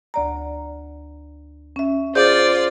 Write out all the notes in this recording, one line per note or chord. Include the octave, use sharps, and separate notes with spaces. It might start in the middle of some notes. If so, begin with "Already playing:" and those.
D2 D5 A#5
C#4 E5
F4 G#4 C5 D5 G6